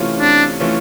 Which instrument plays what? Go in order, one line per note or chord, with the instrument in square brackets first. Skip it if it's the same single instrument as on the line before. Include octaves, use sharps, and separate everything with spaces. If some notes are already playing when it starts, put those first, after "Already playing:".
Already playing: [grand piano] C3 E3 A3 C#4 F4
[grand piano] C3 [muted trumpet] D4
[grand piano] E3 A3 C#4 F4